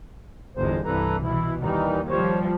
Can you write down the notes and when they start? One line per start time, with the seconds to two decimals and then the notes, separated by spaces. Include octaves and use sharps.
0.57 G1 E2 G#3 C5
0.85 C2 G2 E3 A4 B4 A#5
1.22 B2 E3 E4
1.61 D#2 D#3 E3 G3 D#4
2.09 F3 G3 C5 C#5